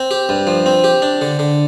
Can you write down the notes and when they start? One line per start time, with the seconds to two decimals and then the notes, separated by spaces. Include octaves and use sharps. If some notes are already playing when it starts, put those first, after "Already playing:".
Already playing: C4
0.11 G4
0.29 G2
0.47 F3
0.66 C4
0.84 G4
1.02 D4
1.21 D3
1.39 D3